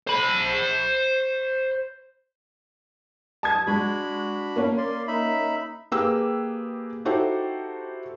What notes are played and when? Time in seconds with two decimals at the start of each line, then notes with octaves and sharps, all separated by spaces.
0.07 C5 B5
3.43 A5 D#6 G#6
3.67 G#3 D4 F#4 B5
4.56 A#3 C#4
4.77 D5 C6
5.08 D#4 E5 B5
5.92 A#3 G4 G#4 B4 E6
7.05 D#4 E4 F#4 G4 A4 C5